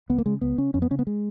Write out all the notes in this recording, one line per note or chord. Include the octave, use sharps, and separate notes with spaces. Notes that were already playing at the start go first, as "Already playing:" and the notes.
C#2 B3
A#3
C#3 G#3
C#2 B3
C#3 C#4
F2 C#4
B3
C#3 C#4
B3
G#3